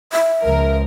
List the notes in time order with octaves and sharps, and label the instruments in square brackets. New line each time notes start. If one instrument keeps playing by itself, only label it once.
[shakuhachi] E5
[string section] C#2 F3 A#4